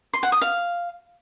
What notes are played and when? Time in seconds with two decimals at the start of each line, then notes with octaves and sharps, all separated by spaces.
0.14 C6
0.23 F#5
0.32 D#6
0.42 F5